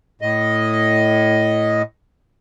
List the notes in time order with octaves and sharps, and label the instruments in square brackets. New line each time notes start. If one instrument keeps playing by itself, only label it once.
[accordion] A2 D#5